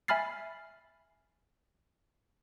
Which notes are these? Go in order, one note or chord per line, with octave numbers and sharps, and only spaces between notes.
E5 G#5 B5 F6 A6 C7